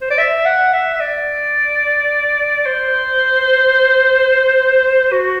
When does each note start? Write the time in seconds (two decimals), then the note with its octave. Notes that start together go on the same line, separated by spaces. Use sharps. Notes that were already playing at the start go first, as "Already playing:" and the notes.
0.01 C5
0.10 D5
0.18 E5
0.46 F#5
0.73 E5
0.94 E5
1.01 D5
2.66 C5
5.12 F#4